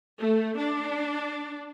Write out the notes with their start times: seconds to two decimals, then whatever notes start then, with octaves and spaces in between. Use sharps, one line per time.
0.18 A3
0.56 D4